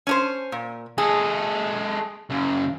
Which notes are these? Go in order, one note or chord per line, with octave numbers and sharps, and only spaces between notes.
C#4 D4 C5
A#2
G#3 G#4 A4
F#2 C#3